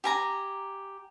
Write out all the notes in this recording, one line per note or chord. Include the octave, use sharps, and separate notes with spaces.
G4 G#5 A#5